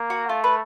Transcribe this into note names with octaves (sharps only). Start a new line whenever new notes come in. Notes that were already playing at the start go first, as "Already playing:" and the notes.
Already playing: A#3
F#4
A3 F4
B4